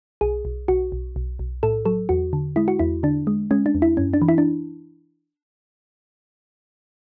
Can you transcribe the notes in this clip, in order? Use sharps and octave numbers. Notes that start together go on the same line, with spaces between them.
B1 G#4
B1
B1 F#4
B1
B1
B1
A2 A4
F#3 A4
E2 F#4
D3
G#3 E4
F#4
E2 E4
D3 D4
G#3
G#3 C#4
D4
E2
E4
F#2 C#4
D4
E3
E4
D4